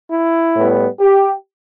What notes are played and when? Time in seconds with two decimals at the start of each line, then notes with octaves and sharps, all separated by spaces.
0.12 E4
0.56 A2 G3 B3
1.00 G4